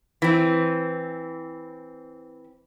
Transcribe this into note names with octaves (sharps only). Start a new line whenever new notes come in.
E3 C4